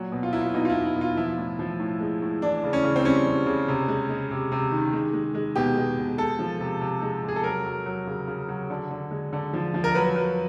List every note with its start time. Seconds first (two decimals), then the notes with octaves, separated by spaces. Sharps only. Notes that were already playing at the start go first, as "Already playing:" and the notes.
Already playing: A#2 F#3
0.12 B2
0.23 F4
0.33 F#3 E4
0.41 F4
0.54 B2 D#4
0.65 F4
0.70 E4
0.74 B2
0.85 E4
0.96 B2 F4
1.17 F3 E4
1.38 A2
1.59 F3
1.80 A2
2.00 G#3
2.22 A2
2.42 E3 D4
2.64 C#3
2.73 C#4
2.84 C#3
2.96 C4
3.05 G3 C#4
3.25 G3
3.46 C#3
3.68 C3
3.88 G#3
4.09 G#3
4.31 C3
4.52 C3
4.72 D#3
4.93 G#3
5.13 G#3
5.35 G#3
5.56 B2 G4
5.77 G#3
5.98 B2
6.18 G#3 A4
6.39 F3
6.60 C3
6.81 C3
7.02 G#3
7.24 C3 G#4
7.36 A4
7.44 F#3 A#4
7.65 F#3
7.86 F#3
8.07 C#3
8.28 C#3
8.48 F#3
8.70 D3
8.91 D3
9.11 G#3
9.33 D3
9.53 F3
9.74 F3
9.84 A#4
9.95 F#3 B4
10.16 F#3